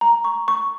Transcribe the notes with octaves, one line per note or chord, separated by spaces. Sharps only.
A#5
C#6
C#6